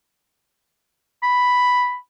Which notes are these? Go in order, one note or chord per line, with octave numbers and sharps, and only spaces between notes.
B5